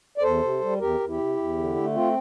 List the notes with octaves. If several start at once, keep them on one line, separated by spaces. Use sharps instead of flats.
D5
E2 A4 C5
C3
G3
E2 G4 A#4
E2
E4 G4
C3
E2
D3
A3
C4 F4